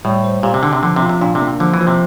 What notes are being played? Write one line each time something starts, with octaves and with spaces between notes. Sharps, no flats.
A2 G3
C5
A#2 G4
C3
D3 D4
C3
D3 F3
C3
F4
C3
A#2 D4
C3
A#3
D3 F3
E3
F3
C3